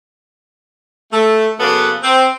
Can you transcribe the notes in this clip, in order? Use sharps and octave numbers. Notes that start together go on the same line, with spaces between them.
A3
C#3 F#3 A#3 B3 A4 B4
C4